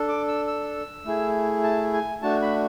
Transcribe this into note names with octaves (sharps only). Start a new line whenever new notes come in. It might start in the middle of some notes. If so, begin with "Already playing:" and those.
Already playing: D4 A4
D6
E6
E6
A3 E4 G#4
A5
G#5
A3 D4 F#4 A5
B5